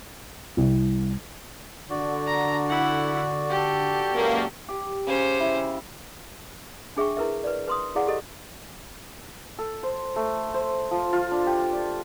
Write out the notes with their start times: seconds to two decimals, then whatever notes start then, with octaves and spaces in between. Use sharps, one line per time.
0.57 C2
1.90 D3 F#4 D5
2.26 A#5
2.68 E4 F#5
3.49 G4 A4
4.14 C#2 F#2 A#3
4.69 G4
5.07 C#3 C#4 C5
5.40 E4
6.97 D4 G#4 E5 G5 C#6
7.17 E4 A#4 B4 E5
7.44 B4 D5
7.67 B4 C6 D#6
7.96 E4 G#4 D5 F5 F#5
8.07 G4 A4 D#5
9.59 A4
9.83 C5
10.16 A3
10.54 C5
10.91 F3
11.13 F4
11.32 D4
11.47 G4
11.73 D5